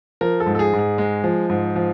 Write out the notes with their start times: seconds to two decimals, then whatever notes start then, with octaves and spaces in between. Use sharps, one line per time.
0.21 F3 A#4
0.40 A4
0.46 G#2
0.55 A4
0.59 G#4
0.73 G#2
0.79 G#4
0.98 G#3
1.24 F3
1.50 G#2
1.76 F3